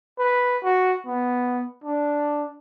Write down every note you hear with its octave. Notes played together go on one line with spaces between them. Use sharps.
B4
F#4
B3
D4